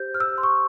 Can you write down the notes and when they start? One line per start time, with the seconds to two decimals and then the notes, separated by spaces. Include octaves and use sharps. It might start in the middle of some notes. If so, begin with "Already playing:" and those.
Already playing: G4 C5 G6
0.14 F6
0.20 E6
0.38 C6
0.43 C#6